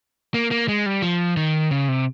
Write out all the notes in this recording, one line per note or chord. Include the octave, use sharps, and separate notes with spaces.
A#3
A#3
G#3
G3
F3
D#3
C#3
C3